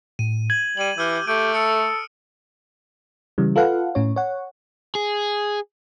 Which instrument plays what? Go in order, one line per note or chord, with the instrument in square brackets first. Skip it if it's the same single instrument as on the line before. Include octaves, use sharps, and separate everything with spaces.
[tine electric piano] A2 [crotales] D#7
[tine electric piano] G#6 [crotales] F#7
[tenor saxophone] G3 [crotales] D#7 F#7
[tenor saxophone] E3 [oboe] G4 [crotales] E6 F6 D#7
[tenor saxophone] A3 [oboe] G4 [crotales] D7
[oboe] A4 [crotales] D#6 C#7
[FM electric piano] C#3 E3 G3
F4 A4 B4 F5 F#5
A2 C#4 C#5
C#5 F#5
[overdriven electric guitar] G#4